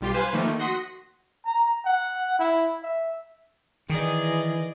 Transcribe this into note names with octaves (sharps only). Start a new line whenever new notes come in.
B1 G3 F4 G4 C6
B4 C5 F5 G#5
D#3 F3 A3 A#3 D#4
F#4 F#5 C6 D#6 A#6 B6
A#5
F#5
E4
E5
D#3 E3 G#4 D5 D#5